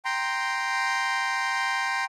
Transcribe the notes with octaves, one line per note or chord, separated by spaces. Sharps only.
G5 A#5 C6